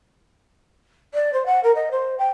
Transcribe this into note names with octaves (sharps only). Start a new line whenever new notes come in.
D5
C5
F#5
A#4
D#5
C5
G5